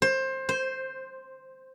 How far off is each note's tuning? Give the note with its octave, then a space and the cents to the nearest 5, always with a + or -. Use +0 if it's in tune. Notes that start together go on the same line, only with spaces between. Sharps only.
C5 +20
C5 +0